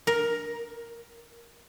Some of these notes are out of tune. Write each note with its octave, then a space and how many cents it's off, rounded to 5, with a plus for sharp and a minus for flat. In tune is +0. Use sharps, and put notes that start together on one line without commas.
A#4 +10